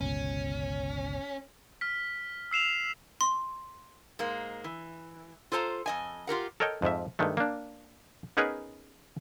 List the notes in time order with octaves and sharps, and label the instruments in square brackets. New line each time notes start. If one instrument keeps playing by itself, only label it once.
[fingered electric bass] G1 C#2 B2 [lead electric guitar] C#4
[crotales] F6 B6
E6 C7 E7 F7
[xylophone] C6
[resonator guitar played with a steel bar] G#2 G#3 A#3
E3
F4 A4 C5 A5 A#5
F2 D#5 G#5
F4 G4 A#4 F#5
[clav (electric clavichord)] A4 A#4 C#5 D#5 G5
F2 G#2 F3 E5
G2 D#3 G#3 A3
A#3 D4
B3 C#4 D#4 G#4 A#4 B4